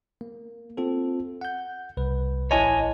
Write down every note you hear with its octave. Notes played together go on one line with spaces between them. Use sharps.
A#3
C4 F4 A4
F#5 G6
C2 B4
A1 E4 C#5 D#5 G#5 A5